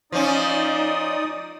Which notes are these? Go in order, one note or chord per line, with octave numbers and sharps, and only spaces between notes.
F3 C#4 D#4 D5 D#6